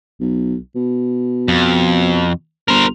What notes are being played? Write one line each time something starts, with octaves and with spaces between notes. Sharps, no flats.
B1
B2
F2
G1 A#4 C5